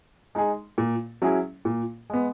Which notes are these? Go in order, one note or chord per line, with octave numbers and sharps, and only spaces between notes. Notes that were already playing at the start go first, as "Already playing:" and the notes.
G#3 D#4 G#4
A#2
F#3 C#4 E4 G#4
A#2
G#3 B3